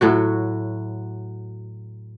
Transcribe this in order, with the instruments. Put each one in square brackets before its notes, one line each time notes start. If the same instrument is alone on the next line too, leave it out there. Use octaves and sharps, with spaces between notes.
[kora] A2 F#3 F#4